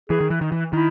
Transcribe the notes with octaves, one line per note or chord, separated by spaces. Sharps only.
E3 G#4
D#3
E3
D#3
E3
D#3 E4